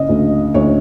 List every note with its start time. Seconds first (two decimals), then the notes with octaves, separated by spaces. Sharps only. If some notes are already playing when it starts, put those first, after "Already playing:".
Already playing: C#3 D#5
0.09 D2
0.54 D2 C#5